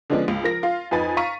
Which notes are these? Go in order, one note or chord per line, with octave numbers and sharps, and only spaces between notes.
D3 F3 G#3 B3 C#4 D4
C#2
F3 A#4 A#6
F4 F5
F2 D#4 B4 G#5 A6
F5 A#5 C#6 B6 D#7